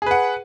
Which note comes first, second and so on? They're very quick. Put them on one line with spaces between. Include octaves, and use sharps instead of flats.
G#4 B4 F#5